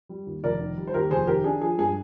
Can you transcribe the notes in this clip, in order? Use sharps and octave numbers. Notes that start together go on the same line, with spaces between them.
G3
D#2
F1 A#4 D5
D#3
G3
C5
D#2 G4 A#4
F1 G#4 C5
D#3 G4 A#4
D4 G#4
F3 G#4
G2 G#4